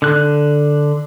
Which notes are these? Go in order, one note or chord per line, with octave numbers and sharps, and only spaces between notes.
D3 F#6